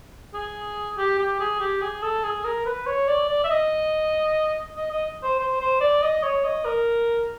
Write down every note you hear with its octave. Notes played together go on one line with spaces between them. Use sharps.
G#4
G4
G4
G#4
G4
G#4
A4
G#4
A#4
B4
C#5
D5
D5
E5
D#5
D#5
D#5
C5
C5
C5
D5
D#5
C#5
D#5
A#4